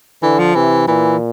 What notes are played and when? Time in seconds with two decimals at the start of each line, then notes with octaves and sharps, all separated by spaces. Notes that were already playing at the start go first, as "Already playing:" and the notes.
0.23 D3 E3
0.39 F3
0.55 C3 E3
0.88 A#2 E3